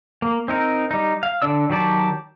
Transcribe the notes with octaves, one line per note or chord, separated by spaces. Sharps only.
A#3
C4 D#4 A#4
G3 D#4
F5
D3 D4 D5 E6
D#3 F#3 G4 D5 A5